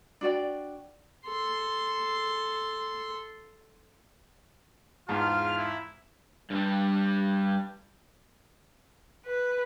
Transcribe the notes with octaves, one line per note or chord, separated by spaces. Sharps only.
D4 F#4 D5 G5
A4 C6
E2 G#2 F4 A5 F6
E4
G2 G3
B4